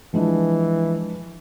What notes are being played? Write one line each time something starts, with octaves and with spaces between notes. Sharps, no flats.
E3 F3 G#3 D4